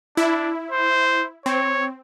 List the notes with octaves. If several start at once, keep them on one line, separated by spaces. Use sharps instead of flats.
D4 E4
C5
C4 C#5